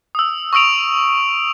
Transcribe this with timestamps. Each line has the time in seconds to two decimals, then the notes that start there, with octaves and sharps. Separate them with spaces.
0.15 D#6 E6
0.53 C#6 D#6 E6 D7 F7